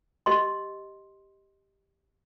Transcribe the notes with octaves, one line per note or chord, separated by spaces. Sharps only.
G4 D#5 C6